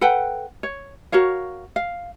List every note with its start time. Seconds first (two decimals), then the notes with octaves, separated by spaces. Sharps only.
0.01 A4 B4 F#5 G5
0.63 C#5
1.12 F#4 A#4 C#5 F5
1.76 F5